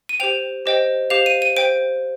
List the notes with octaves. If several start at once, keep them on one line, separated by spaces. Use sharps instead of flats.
D#7
G4 C5 G5 F7
G4 C5 D#5 G5
G4 C5 F5 F7
D#7
D#7
C5 G5 D7